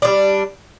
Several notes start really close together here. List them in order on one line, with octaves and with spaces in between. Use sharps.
D4 F3 G3